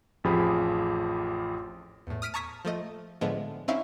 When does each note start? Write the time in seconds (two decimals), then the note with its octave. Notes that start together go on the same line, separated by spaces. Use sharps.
0.24 A1 F2 F3 G4 G#4 B5
2.07 E2 A2
2.22 D#6 F6 B6 D7 D#7
2.34 A5 A#5 C#6 D#6 G#6 B6
2.65 F3 A3 D#5
3.21 A2 D3 F3 G#3 B3
3.68 C4 C#4 D#4 E4 E5 F5